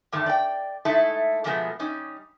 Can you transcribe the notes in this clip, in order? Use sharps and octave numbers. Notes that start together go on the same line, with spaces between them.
E2 G2 D3 D#3 A3
D5 G5
G#3 A3 D#4 E4 A4 E5
B2 D3 F3 G#3 A3 B3
G3 C#4 D#4